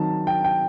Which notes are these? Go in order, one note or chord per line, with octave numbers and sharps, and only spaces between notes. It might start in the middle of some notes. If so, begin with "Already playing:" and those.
Already playing: D#3 F#3 C4 D#4 A5
G5
G5